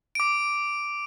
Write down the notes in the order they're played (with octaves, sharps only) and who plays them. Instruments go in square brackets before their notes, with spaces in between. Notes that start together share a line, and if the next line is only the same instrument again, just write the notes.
[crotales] D6 D7